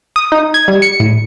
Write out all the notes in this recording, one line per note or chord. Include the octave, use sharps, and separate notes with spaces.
D#6
D#4
G#6
G3
C#7
A2